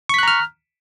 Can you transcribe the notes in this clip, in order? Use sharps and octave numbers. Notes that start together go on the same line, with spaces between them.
A#5 C#6 F6 F#6 B6